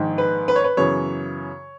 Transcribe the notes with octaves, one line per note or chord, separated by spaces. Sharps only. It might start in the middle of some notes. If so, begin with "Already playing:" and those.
Already playing: A#1 G#2 D#3
B4
B4
C#5
B4
F#2 C#3 E3 B3 C#5